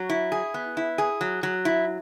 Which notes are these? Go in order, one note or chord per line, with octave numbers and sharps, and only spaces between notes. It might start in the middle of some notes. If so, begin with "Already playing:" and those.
Already playing: F#3
E4
G#4
B3
E4
G#4
F#3
F#3
E4